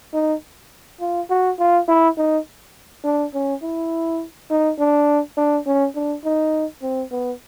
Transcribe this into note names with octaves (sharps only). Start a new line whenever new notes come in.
D#4
F4
F#4
F4
E4
D#4
D4
C#4
E4
D#4
D4
D4
C#4
D4
D#4
C4
B3